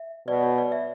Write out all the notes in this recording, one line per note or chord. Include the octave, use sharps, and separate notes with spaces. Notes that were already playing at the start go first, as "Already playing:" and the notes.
Already playing: E5
B2 D5
C#5
D5
E5